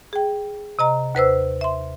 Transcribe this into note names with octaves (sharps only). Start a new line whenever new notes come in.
G#4 G5
C3 D#5 A#5
D#2 B4 C5 E6
E5 C6